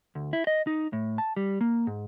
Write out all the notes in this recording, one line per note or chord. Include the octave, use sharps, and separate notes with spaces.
D2
E4
D#5
D#4
A2
A5
G3
A#3
G#2